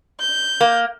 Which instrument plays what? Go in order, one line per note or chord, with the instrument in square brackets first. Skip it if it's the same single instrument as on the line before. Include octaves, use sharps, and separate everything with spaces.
[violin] G6
[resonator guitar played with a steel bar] A#3